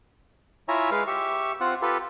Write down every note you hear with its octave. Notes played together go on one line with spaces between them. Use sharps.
E4 F4 C#5 E5 G#5 A#5
G#3 B4 F5
G4 E5 C#6
C4 F4 F#5
F4 G4 A4 B4